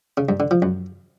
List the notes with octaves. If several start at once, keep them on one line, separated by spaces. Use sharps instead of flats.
C#3
G2
D3
F3
F#2